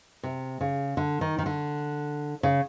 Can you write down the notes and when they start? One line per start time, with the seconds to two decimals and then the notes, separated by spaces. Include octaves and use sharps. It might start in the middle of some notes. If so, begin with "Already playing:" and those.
0.23 C3
0.61 C#3
0.97 D3
1.21 D#3
1.38 D#3
1.46 D3
2.43 C#3